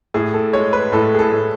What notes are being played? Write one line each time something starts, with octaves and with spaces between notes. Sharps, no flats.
A2 G#4
A4
G#3 C#5
B4
A2 A4
G#4
A4
A2